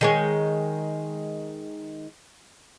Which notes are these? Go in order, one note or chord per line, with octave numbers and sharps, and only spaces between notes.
D#3 G#3 C#5